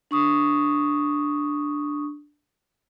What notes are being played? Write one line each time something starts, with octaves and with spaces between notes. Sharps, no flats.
D4 C#6 D#6